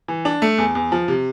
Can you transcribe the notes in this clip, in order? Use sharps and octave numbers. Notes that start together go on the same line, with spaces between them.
E3
D4
A3
E2
E2
F3
C3